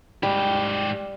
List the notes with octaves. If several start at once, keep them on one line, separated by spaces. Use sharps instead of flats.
G#2 G3 G4